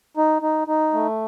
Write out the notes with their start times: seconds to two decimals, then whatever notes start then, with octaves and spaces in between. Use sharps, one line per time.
0.17 D#4
0.42 D#4
0.68 D#4
0.93 A3